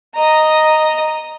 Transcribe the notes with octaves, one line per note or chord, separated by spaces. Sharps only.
D#5 A#5